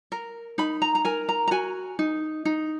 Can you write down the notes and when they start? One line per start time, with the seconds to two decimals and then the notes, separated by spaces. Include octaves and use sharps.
0.12 A#4
0.58 D#4 B5
0.82 A#5
0.95 A#5
1.05 A#4 G#5
1.29 A#5
1.48 A#5
1.51 F#4 G#5
1.99 D#4
2.45 D#4